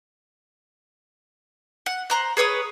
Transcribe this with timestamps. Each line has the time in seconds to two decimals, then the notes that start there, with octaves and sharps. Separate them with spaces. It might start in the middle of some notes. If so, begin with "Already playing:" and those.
1.86 F#5
2.10 C5 A#5 F#6
2.37 G#4 B4 C#5 D#6